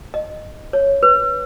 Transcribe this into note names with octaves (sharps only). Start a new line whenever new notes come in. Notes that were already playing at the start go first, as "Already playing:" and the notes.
D#5
C#5
B4